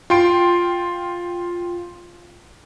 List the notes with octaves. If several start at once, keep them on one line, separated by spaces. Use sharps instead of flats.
F4 G5 C6 D7